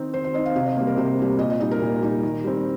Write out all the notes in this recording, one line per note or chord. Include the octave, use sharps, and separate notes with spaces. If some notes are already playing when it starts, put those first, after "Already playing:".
Already playing: D#3 C4 D#4
D#3 C5
C5
C4 D#4 D#5
F5
C3 F5
D#5
G3 A#3 C5
A#4
C3 C5
G3 A#3
A#2 D#5
D#5
G3 D#4 D#5
A#4
A#2
G3 D#4
D#3
G3 C4